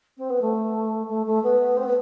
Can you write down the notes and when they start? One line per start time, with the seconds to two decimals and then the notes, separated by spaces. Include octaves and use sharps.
0.18 C4
0.30 B3
0.41 A3
1.09 A3
1.26 A3
1.43 B3
1.77 C4
1.86 B3